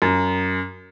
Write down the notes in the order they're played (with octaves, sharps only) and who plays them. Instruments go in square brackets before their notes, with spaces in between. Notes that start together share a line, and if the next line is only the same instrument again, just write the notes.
[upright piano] F#2